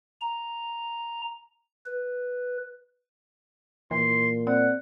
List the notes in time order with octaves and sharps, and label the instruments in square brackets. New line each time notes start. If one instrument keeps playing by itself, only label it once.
[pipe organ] A#5
B4
[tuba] A#2 [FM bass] E3 [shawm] C6
[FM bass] C4 [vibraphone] D5 [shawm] F#5